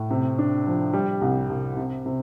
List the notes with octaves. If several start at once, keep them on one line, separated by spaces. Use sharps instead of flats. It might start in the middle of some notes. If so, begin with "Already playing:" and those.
Already playing: A2
C3
D4
F3
G3
C2
C2
C3
C3